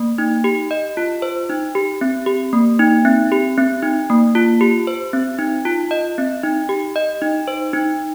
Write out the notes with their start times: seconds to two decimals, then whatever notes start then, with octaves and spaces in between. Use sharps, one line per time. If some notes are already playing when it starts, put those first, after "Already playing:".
Already playing: A#3
0.18 D#4
0.44 G4
0.71 D#5
0.97 F4
1.22 C5
1.49 D#4
1.75 G4
2.01 C4
2.26 G4
2.53 A#3
2.79 D#4
3.05 C4
3.32 G4
3.57 C4
3.83 D#4
4.10 A#3
4.35 F4
4.61 G4
4.87 C5
5.13 C4
5.39 D#4
5.65 F4
5.91 D#5
6.18 C4
6.43 D#4
6.69 G4
6.96 D#5
7.22 D#4
7.48 C5
7.73 D#4